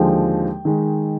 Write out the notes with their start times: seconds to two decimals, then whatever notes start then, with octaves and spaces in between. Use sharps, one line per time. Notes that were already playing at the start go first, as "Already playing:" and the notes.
Already playing: D#2 D3 F3 G#3 G5
0.65 D#3 G#3